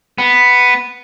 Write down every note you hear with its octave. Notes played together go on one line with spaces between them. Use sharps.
B3